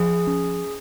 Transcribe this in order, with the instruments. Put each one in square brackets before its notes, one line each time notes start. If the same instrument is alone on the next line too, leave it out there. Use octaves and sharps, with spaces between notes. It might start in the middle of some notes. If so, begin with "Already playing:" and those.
Already playing: [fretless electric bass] F3 [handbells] G#4
[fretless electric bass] C#4